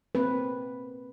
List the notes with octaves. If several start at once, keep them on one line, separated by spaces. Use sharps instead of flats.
A#3 C4 B4